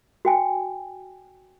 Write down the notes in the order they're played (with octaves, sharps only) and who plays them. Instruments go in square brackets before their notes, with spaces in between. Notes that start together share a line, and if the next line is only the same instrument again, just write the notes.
[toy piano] F#4 G5 G#5